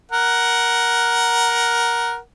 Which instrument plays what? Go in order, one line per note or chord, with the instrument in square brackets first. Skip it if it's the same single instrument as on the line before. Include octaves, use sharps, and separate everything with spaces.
[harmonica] A#4 F#5